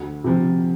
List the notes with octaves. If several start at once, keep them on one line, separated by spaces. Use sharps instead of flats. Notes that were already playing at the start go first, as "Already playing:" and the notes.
Already playing: D2
C3 F3